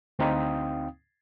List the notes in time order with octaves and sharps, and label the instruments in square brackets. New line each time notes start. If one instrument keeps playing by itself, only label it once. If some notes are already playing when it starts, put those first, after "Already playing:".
[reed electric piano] D2 C4 D#4 F5 G5 D#6